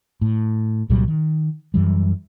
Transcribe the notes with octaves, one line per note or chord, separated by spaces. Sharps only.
A2
C2 A#2 F#3 G3
D#3
F#2 E3 G3